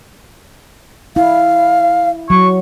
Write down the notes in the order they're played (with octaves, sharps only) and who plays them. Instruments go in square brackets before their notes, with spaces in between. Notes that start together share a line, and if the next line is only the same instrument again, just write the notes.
[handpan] E4 [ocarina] F5
[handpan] F#3 [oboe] C#6